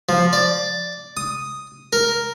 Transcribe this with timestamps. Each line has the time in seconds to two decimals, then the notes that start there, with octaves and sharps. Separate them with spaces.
0.09 F3
0.33 D5
1.17 D#6
1.93 A#4